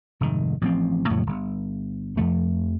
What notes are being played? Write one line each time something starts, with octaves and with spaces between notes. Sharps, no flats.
F1 G#2 D#3
A1 F3 A3 C4
F2 A2 C#3 F#3
G1
F2 F3 A3